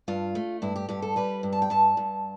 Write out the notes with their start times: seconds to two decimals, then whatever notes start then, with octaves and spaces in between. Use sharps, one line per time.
0.08 G2 F4
0.35 A3
0.62 G2 E4
0.76 G4
0.89 G2 G4
1.02 A4
1.16 G3 B4
1.43 G2
1.52 A5
1.62 G5
1.70 G2 A5
1.97 G2